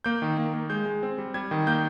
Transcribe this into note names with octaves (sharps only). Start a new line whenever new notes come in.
A#3 G6
D#3
A#3
A#3
G#3 G6
G#3
C4
G3
G3 G#6
D#3
A#3 G6